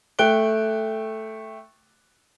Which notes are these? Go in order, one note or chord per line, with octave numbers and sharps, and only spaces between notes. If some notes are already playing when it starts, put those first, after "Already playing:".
A3 G5 F#6 D7 G7